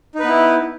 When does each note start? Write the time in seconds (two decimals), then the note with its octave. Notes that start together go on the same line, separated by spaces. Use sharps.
0.15 D#4
0.20 B4
0.24 B3
0.28 E4